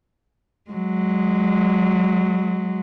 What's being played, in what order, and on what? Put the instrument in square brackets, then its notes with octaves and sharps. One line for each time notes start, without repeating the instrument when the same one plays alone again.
[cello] F#3 G#3